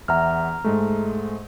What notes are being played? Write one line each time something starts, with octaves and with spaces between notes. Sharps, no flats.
E2 E5 F#5 A#5 F6
G#2 G#3 A3